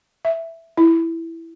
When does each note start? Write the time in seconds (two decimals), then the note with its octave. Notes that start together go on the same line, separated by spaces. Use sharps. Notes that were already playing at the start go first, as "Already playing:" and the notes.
0.25 E5
0.77 E4